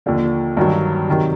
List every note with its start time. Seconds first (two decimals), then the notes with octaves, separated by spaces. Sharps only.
0.06 D#2 D3 F3
0.57 G2 D#3 F#3
1.08 C3 D#3 F#3